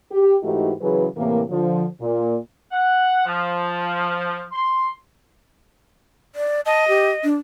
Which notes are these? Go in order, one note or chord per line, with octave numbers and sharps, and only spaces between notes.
G4
G#2 E3 A3 D#4 F#4 G4
C#3 E3 F#3 G#4 B4
A2 C3 E3 A#3
D3 F3
A#2
F#5
F3
C6
D5
D#5 A5
G4
D4